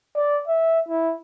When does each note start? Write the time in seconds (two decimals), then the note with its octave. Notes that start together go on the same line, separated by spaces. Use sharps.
0.16 D5
0.48 E5
0.89 E4